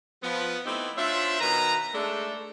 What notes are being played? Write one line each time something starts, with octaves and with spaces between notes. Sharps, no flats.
F3 B3
A3 B3 C4 D#4 E4 G4
D4 F4 C5 C#5 E5
B2 D#3 B4 A#5
G#3 A3 D4 A4